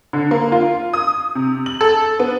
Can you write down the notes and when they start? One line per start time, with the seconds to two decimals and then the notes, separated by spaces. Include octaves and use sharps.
0.13 D3
0.31 A#3
0.52 F4
0.93 D#6
1.35 C3
1.66 F#7
1.81 A4
2.20 B3